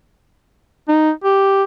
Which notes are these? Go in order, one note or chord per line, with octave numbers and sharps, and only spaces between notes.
D#4
G4